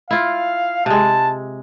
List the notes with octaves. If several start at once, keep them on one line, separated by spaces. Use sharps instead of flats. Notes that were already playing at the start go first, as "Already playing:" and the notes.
E4 F4 F5
C3 G#3 A5